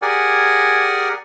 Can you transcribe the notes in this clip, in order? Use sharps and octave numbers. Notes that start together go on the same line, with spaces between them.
G4 G#4 A#4 D5 F#5 G#5